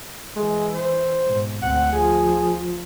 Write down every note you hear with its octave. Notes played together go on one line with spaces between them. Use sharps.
E3 G#3
C5
G#2 B2
D2 C4 F#5
F3 G#4